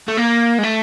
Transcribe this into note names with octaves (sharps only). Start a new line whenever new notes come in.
A3
A#3
G#3
A3